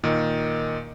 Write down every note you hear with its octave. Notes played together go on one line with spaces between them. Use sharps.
A#2 D#3